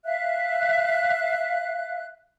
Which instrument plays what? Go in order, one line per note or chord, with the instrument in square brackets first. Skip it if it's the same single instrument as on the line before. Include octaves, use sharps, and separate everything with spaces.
[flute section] E5 F5 F#6